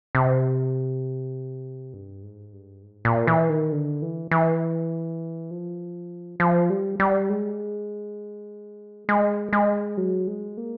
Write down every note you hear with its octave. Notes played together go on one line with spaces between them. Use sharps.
C3
G2
G#2
G2
G#2
A#2
E3
D#3
D3
E3
E3
F3
F3
G3
G3
G#3
G#3
G#3
F#3
G#3
A#3